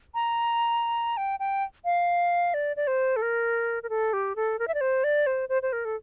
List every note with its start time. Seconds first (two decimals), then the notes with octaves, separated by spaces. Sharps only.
0.15 A#5
1.17 G5
1.40 G5
1.85 F5
2.54 D5
2.76 D5
2.87 C5
3.16 A4
3.22 A#4
3.83 A#4
3.90 A4
4.13 G4
4.36 A4
4.59 A#4
4.68 E5
4.74 D5
4.81 C5
5.04 D5
5.27 C5
5.49 C5
5.62 C5
5.73 A#4
5.85 A4